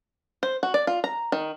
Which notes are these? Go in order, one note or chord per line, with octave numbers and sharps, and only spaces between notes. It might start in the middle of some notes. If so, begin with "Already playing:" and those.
C5
F#4
D5
F4
A#5
D#3